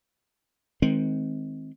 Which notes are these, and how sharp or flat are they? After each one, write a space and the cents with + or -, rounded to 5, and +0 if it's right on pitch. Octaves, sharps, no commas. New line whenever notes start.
D#3 +25 G#3 +25 C4 +0